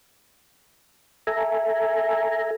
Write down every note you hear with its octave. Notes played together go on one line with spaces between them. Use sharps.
A4 E5 G#5 A#5